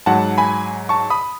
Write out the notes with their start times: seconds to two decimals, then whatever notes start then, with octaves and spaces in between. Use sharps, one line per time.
0.06 G#2 F#3 F#5 A5
0.38 G#5 B5
0.89 A5 C#6
1.10 B5 D#6